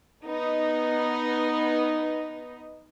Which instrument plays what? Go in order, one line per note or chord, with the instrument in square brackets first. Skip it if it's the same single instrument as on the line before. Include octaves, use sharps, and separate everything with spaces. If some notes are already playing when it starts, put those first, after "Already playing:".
[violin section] B3 D#4